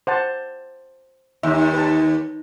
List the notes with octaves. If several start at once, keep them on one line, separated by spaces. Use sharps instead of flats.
C5 F#5 A5
D#2 D#4 E5
B4 A5